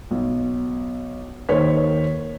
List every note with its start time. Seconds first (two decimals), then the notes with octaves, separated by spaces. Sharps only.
0.11 B1
1.49 D#2 D#3 C5 C#5 B6